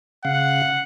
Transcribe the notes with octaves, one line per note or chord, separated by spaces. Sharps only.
C#3 F5 F#5